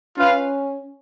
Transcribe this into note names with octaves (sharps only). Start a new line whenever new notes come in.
C#4 F4 B4 F5